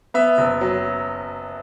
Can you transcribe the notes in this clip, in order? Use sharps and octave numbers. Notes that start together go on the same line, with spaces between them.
B3 E5
F#1
F#3